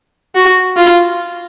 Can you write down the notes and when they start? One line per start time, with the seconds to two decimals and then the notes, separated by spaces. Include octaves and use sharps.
0.35 F#4
0.77 F4